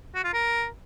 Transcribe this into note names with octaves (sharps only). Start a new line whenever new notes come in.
F#4
F4
A#4